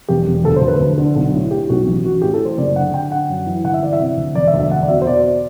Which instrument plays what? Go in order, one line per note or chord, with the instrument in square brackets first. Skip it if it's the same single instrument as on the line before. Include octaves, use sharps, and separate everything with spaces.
[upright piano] E1 G4
E1
D2 A4
C5
D2
B4
D2
D3
B1
A2
A2 G4
B1 F#4
A1
A1 F#4
A2 G4
A4
A2
C5
F#1 D5
D3 F#5
D3 G5
D3 F#5
F#2
E3
G1 F#5
E5
E3 D5
E5
C3
D2
E1 D5
E5
D2
E5
E1 F#5
D5
B2 E5
C5
B2 D5